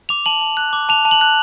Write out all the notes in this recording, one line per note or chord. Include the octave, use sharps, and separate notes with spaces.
D6 F7
A5 F#7
A5
F#6
D6
A5 F7
A5
F#7
F#6